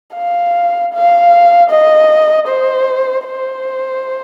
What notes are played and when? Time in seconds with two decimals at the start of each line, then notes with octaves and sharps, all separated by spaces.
0.15 F5
0.93 F5
1.70 D#5
2.48 C5
3.24 C5